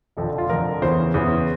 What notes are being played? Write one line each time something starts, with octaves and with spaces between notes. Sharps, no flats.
F1 F2 D3 F3 A4
F4
F1 F2 D3 F3 A#4
E2 C#3 E3 C5
E2 C#3 E3